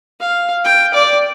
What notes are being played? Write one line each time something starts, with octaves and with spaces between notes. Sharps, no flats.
F5
G5
D5